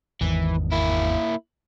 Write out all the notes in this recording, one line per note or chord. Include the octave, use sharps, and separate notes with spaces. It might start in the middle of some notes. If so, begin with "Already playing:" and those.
G#1 E2 D#3 E3
A#3 E4